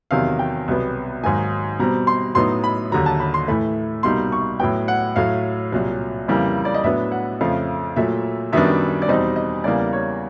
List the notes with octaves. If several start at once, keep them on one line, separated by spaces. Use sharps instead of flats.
E2 C3 D#3 F#3 F5
G5
C2 B2 F#3 B3
G#2 D#3 F#3 A#3 D#4 G#5
B2 G3 C4 A#5
C6
A2 F#3 B3 D#4 C6
B5
D#2 D3 F#3 A#5
A5
B5
C6
A2 E3 A3 B5
C2 B2 G3 A#3 D#4 C6
C#6
A2 F#3 B3 G5
F#5
A2 F#3 A3 F5
C2 A#2 F#3
F2 C#3 E3 G3 A#3
D5
D#5
A2 F#3 B3 D4 E5
F#5
F2 C#3 F3 A3 F5
A#2 F#3 A3 E5
F#2 D#3 G3 B3 D4 E5
D5
E2 B2 G3 C4 D#4 D#5
D#5
E2 C#3 E3 G3 A#3 D5
C#5